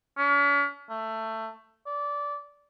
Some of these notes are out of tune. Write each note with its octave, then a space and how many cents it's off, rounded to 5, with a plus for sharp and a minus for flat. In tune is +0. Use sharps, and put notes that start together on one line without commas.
C#4 +45
A3 +15
D5 -15